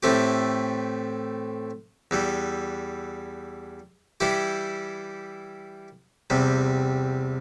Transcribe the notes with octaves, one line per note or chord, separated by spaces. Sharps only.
A2 E3 A3 C4 G4
E2 E3 G3
E3 G3 E4 G4
E2 C3 G3